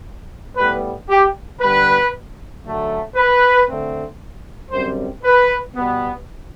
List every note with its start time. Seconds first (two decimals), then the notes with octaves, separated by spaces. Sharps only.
0.57 A2 G3 B3 B4
1.09 G4
1.60 D3 G3 B3 B4
2.64 D3 F#3 A3
3.16 B4
3.68 D3 A3 C4
4.71 F#2 D3 G3 C4 C5
5.24 B4
5.75 B2 G3 B3